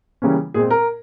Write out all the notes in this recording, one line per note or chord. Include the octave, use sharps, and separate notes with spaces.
C#3 E3 G3 A#3 C#4
A#2 G#3 C4 G#4
A#4